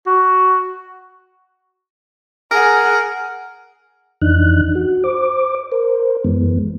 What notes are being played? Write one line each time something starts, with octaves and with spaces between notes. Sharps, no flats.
F#4
G#4 A#4 F#5
F2 E3 D4 D#4 F#6
F#4
C5 D6
A#4 C5
F#2 E3 G#3 B3